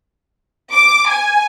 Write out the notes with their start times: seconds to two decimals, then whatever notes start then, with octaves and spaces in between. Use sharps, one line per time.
0.72 D6
1.08 G#5